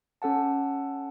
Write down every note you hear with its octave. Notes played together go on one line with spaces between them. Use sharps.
C#4 A4 F#5 A5